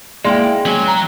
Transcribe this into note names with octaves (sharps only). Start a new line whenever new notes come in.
G#3 A#3 E4 D5 G5 C6
F#3 C#4
A#5